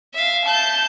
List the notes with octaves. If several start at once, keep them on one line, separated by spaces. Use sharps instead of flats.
E5 F5
A5 G6